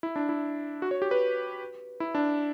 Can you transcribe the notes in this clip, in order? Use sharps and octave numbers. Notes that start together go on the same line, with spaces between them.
E4
D4
E4
F#4
C#5
G4
B4
E4
D4